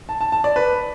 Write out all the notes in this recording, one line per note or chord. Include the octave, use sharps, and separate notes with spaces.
A5
A5
A5
D5
B4